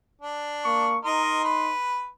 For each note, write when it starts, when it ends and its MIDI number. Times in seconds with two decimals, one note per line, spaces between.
0.22 0.95 62
0.63 0.97 58
0.63 0.97 85
1.05 1.72 63
1.05 1.42 70
1.05 1.42 75
1.05 1.72 84
1.44 2.06 71